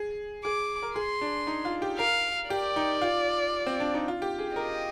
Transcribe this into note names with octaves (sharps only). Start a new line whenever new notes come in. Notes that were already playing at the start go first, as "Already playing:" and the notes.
Already playing: G#4
G#4 D6
A#4
G#4 C6
D4
D#4
F4
G4
A#4 F5
G4 D5
D#4
F4
C4
D4
D#4
F4
G4
G#4
A#4 D#5